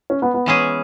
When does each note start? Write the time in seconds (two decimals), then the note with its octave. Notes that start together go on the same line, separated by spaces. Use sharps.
0.10 C#4
0.22 B3
0.34 B3
0.46 E3 G#3 C#4 G#4